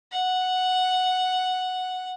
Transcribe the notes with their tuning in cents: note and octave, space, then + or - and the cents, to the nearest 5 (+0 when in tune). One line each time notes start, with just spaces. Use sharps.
F#5 -5